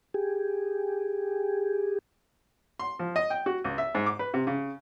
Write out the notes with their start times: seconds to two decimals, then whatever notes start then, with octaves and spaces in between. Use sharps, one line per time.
0.14 G4 G#4
2.79 C6
2.99 F3
3.16 D#5
3.30 G5
3.46 F#4
3.64 C#2
3.78 E5
3.95 G#2
4.06 D6
4.19 B4
4.34 C3
4.47 C#3